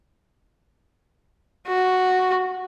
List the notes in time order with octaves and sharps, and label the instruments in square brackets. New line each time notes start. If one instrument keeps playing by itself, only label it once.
[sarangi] F#4